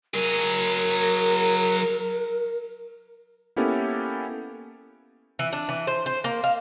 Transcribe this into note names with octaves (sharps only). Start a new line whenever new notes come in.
F#3 G#4 A#4
A#3 B3 C#4 E4 G4 A4
E3
D4
E3
C5
C5
A#3
F5